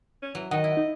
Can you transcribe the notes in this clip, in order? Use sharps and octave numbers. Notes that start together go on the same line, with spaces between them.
C#4
E3 F#3
D#3 D#5 F#5
E4
D#4